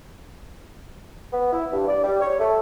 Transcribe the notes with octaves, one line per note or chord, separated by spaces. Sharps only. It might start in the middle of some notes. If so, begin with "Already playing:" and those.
B3
E4
G2
D5
G3
C#5
A3